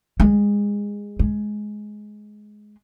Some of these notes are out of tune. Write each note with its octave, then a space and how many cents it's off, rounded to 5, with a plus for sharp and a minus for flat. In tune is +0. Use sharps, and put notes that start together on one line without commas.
G#3 -20
G#3 +15